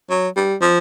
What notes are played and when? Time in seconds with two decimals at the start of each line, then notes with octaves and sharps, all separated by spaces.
0.10 F#3
0.36 G3
0.61 F3